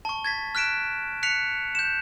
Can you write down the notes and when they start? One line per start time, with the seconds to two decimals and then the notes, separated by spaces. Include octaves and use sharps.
0.05 A5 C#6
0.24 G#6 A6 B6
0.55 F6 F#6 B6 D7 E7
1.23 F#6 B6 C#7 F7
1.75 G6 E7